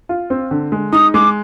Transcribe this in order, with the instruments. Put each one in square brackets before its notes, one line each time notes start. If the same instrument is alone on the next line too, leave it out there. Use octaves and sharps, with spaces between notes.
[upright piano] F4
C4
D3
G#3
[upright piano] D#4 [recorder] D#6
[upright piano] G#3 [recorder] D6